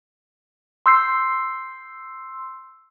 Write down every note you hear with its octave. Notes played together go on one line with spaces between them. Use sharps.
C6 E6 G6 C7